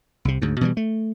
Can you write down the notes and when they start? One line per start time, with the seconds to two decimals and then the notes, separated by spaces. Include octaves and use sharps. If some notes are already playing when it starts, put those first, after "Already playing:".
0.25 C2 C3
0.42 D2 G#2
0.61 B2 E3 F3 G3
0.77 A3